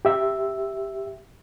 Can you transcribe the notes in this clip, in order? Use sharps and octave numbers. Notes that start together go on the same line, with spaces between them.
G4 E5